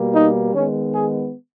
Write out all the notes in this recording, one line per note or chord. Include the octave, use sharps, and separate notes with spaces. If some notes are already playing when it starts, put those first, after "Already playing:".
Already playing: B2 G3 A#3
D#4
D#3 G#3 B3 C#4
G#4